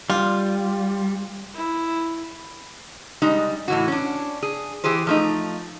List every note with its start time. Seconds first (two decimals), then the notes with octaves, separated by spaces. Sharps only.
0.10 G3 F4
1.55 E4
3.22 G3 G#3 D#4
3.68 A2 E3 F#4
3.88 C#4 D4
4.43 G#4
4.84 E3 G4 G#4 C5
5.07 F3 A3 D#4